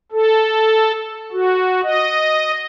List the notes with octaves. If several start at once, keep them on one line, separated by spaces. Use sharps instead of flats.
A4
F#4
D#5